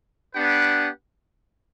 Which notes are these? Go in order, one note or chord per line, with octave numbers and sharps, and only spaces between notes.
B3 D4 G4 B4 F#5